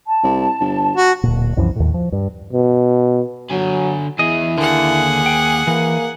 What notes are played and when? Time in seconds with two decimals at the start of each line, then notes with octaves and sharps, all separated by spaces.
0.06 A5
0.24 C2
0.60 G1
0.96 F#4
1.23 D1 A#2
1.56 C2 F#2 E3 F3
1.76 D#2 A2
1.94 F3
2.12 G2
2.53 B2
3.51 D3 F#3 G#5
4.19 E2 E4 G#4 D#5
4.58 D#2 D3 A#3 G#4 F#5
5.26 G5
5.67 E3 A#3